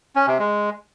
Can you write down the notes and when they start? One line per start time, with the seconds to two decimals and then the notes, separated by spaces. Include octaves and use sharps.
0.16 C#4
0.27 C3
0.39 G#3